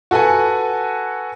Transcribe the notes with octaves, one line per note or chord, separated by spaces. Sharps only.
F#4 A4 B4 F#5 G#5